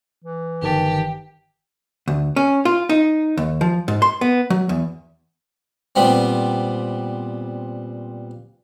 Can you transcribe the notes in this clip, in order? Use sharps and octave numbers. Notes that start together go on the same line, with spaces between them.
E3
G1 D#3 G4 A5
D2
C#4
F4
D#4
D#2
F3
G#2
C6
B3
F#3
E2
A#2 G3 B3 C4